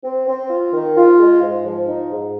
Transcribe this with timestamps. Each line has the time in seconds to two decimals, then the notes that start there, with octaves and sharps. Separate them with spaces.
0.04 C4
0.27 C4
0.50 F4
0.73 D#3
0.96 F4
1.18 G#3
1.41 G#2
1.64 F3
1.87 D#4
2.11 G#2